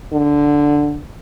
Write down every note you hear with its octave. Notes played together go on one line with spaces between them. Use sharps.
D3